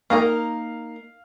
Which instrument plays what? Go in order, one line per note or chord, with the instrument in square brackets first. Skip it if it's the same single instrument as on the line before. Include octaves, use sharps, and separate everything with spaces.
[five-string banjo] A#3 D#4 A#4 [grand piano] F5